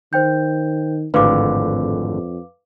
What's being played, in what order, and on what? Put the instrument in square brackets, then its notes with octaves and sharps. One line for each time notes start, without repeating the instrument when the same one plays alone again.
[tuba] D#3 [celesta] C5 G5 G6
[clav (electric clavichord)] G#1 A2 D3 [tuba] F2 [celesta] B4 F5 D6